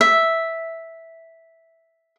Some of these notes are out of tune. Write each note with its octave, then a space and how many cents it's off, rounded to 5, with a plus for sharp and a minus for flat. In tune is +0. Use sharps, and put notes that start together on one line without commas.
E5 -5